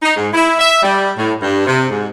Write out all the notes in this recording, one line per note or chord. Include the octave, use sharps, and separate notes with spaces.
D#4
G#2
E4
E5
G3
A2
G2
C3
G#2